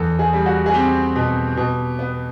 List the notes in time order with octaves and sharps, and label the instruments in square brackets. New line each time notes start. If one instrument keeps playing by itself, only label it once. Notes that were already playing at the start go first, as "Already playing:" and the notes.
Already playing: [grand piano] E2 A4
G#4
G3
F#4
G#4
C4 G4
B2
B2
B3